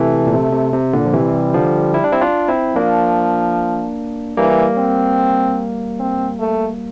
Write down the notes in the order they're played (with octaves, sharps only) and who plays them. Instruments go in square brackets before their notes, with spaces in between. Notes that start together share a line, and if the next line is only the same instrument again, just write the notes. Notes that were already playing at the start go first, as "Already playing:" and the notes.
Already playing: [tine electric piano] C3 E3 [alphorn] A3
[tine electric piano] A#2
C3
C3
C3
A#2 D3
F3
[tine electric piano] C3 E3 [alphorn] G3
[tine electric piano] D3 F3
E4
D4
C4 E4
D4 F4
C4 E4
[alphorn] F3 [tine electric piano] A#3 D4
[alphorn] E3 [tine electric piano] G3 A#3
[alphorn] C4
C4
A3